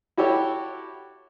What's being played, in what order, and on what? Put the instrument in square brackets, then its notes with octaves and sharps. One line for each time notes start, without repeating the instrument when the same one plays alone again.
[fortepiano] E4 F#4 G4 A4 C#5